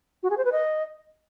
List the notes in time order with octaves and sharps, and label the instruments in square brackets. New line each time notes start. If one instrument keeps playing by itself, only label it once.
[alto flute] F#4
G#4
C5
B4
D#5